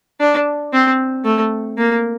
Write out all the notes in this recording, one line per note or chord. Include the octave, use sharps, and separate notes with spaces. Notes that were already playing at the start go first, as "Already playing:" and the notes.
D4
C4
A3
A#3